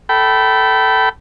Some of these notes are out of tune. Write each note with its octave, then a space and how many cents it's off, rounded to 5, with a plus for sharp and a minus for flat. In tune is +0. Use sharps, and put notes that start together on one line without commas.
A4 +0 G5 -25 B5 +0